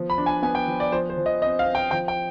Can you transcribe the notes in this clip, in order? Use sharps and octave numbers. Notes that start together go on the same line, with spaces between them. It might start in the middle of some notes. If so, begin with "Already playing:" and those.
Already playing: F3 B3
B5
D4
G#5
B3 G#5
G5
F3
D5
F3 C5
C5
F3
D#5
C4 D#5
F5
C4
G5
F3 G5
G5